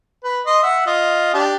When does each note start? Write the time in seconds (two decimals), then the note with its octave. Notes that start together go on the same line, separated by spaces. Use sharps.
0.24 B4
0.46 D#5 C6
0.63 E5 F#5
0.86 F4 D#5
1.34 D4 G4